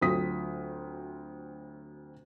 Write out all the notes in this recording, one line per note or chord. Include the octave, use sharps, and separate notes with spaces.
D2 F#3 C4 F4 D#6 B6